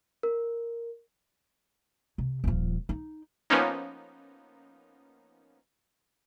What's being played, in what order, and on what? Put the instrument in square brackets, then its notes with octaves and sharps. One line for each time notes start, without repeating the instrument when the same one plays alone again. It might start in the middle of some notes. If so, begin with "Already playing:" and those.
[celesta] A#4
[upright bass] C3
D#1 F3
D#4
[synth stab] F3 A#3 B3 C#4 D#4